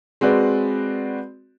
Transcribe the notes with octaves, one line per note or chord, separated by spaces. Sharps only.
G#3 C4 F#4 B4 D5